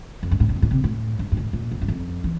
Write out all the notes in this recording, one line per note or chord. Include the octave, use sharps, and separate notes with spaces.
F2
G2
A2
D3
C3
A#2
C3
A2
G2
G2
A2
A#2
E2
G2
F2
E3